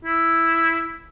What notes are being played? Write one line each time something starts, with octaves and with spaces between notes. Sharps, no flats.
E4